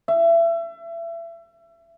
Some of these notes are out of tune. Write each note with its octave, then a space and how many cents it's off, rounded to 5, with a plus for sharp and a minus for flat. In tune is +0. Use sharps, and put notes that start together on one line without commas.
E5 +30